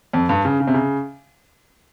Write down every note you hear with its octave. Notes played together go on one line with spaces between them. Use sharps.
F2
G2
C#3
C#3
C3
C#3